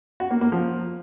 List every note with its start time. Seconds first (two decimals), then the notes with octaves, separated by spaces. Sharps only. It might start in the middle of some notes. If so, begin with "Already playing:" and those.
0.20 F#4
0.31 A#3
0.41 A#3
0.52 F3